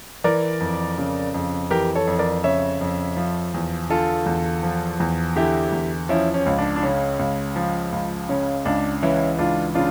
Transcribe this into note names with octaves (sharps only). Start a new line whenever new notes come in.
E3 A#4 D5
F2
C#3
F2
E3 G4 A#4
A4 C#5
F2
A#4 D5
C#3 C#5 E5
F2
F3
E2
D3 F4 A4
E2
F3
E2
D3 E4 G4
E2
F3 C#4 E4
C#4
C#2
D4
D4
C#3 C#4
C#2
F3
C#2
C#3 C#4
C#2 D4
E3 C#4 E4
C#2 D4 F4
C#3 D4 F4